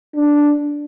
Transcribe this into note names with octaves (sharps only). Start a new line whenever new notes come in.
D4